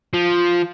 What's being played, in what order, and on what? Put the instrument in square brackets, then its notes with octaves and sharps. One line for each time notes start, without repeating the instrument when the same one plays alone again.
[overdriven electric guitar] F3